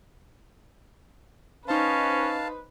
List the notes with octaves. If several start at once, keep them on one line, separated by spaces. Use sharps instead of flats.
C#4 D#4 B4 C5 F5 A5